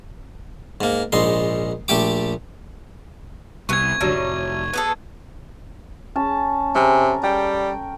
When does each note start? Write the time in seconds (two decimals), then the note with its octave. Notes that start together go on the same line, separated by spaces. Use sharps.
0.81 G#2 A#3
1.12 A#1 G#2 D#4 C6
1.88 A#1 A3 G4 D6
3.69 C2 C3 B3 G#5 C#6 G#6
4.01 C2 F#2 A2 D3 F#3 G3
4.13 F1
4.73 B3 G#4 A4
6.16 C#4 A5
6.75 C3 A4 A#4 G#5
7.24 G3 G5